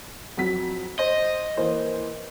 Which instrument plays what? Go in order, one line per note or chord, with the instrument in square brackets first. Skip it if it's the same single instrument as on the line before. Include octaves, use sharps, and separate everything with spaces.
[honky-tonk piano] F2 F#3 B6
[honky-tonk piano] C5 [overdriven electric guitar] D#5
[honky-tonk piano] E3 A#3 C5